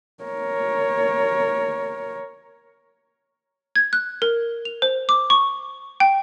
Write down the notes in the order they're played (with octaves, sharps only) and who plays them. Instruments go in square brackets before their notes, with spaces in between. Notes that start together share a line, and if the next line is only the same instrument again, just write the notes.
[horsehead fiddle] A#4 C#5
[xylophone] G#6
F#6
A#4
F7
C5
D6
C#6
G5